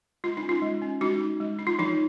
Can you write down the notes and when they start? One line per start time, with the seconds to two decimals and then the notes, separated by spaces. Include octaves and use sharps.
0.24 G#3 F4
0.37 D#4
0.43 C#4
0.49 F4
0.62 G#3
0.82 C#4
1.01 G#3 D#4 F#4
1.20 D#4
1.40 G#3
1.59 D#4
1.67 F4
1.79 F3 D#4